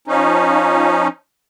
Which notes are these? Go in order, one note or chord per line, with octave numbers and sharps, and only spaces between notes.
F3 C#4 D#4